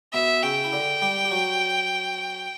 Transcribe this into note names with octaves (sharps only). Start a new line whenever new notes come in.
B2 B3 E5
C#3 C#4 G5
E4
D3 D4
G3 G4
G4
F#3 F#4